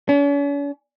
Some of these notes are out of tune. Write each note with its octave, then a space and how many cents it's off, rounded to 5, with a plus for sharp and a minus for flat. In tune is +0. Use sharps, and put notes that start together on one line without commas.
C#4 +45